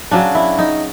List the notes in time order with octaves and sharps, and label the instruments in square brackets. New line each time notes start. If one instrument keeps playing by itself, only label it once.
[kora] C#3 F#3 D4
E4
D#4